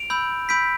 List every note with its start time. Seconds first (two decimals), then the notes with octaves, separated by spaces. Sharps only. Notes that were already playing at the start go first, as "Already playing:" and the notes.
Already playing: D7 F7
0.10 B5 E6 G6
0.49 B5 E6 G6 B6 D7